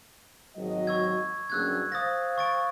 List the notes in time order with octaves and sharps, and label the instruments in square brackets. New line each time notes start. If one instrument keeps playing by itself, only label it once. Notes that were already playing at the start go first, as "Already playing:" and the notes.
[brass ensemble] G#1 F#3 D#5
[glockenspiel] C#6 E6 G#6
[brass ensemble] F#1 G2 [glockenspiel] E6 F#6 G#6
[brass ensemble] C5 F5 [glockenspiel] D#6 A6 A#6
[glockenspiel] C#6 A6 D7